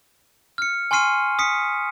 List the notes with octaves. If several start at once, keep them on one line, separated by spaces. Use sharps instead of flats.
F6 C#7
G#5 C6 C#6 F6 C7 D#7
D#6 B6 C#7